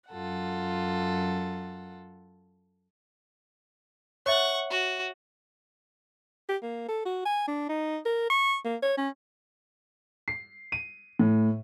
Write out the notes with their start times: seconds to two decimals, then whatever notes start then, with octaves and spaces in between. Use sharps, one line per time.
0.10 F#2 F4 A4 F#5
4.26 C#5 E5 F#5 C#6
4.70 F#4
6.49 G4
6.62 A#3
6.88 A4
7.05 F#4
7.25 G#5
7.48 D4
7.69 D#4
8.05 A#4
8.30 C#6
8.65 A#3
8.82 C#5
8.97 C#4
10.28 C7
10.72 D#7
11.19 A2